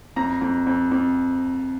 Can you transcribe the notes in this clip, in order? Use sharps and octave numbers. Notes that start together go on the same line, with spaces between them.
F2 A#5
F2
F2
F2